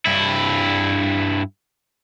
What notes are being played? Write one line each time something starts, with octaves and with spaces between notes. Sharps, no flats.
G2 E4